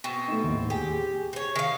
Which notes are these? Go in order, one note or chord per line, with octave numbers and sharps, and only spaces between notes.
B2 C4
A3 D#4
D#2 A2
G4 G#4
C5 C#5
D#3 F5